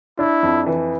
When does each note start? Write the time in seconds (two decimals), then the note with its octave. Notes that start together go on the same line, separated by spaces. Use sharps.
0.19 D4 E4
0.43 F2
0.66 E3